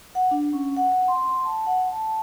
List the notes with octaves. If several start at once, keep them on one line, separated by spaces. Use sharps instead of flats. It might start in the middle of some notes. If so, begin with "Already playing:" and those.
F#5
D4
C#4
F#5
F#5
C6
A5
F#5
A5